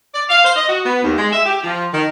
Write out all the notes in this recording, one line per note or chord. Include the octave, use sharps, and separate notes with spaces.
D5
F5
C5
D#5
F#4
B3
D#2
G#3
E5
G4
F3
D#3